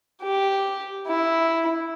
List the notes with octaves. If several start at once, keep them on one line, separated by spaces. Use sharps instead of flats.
G4
E4